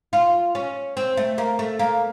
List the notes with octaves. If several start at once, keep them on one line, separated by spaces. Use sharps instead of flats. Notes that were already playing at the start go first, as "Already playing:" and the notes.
F4
C#4
C4
A3
A#3
A3
A#3